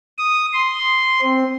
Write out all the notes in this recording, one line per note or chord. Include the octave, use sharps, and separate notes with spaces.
D#6
C6
C4